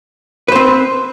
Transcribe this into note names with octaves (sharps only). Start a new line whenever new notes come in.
C4 B4 C5